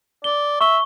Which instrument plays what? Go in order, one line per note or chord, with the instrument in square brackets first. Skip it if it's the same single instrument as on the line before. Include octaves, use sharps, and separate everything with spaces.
[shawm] D5 [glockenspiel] G7
[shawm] E5 [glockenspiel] C#6 G7